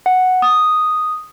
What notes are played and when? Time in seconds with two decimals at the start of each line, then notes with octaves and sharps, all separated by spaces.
0.06 F#5
0.42 D#6